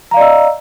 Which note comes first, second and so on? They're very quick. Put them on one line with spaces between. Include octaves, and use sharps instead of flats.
A#5 F5 D5 D#5 E6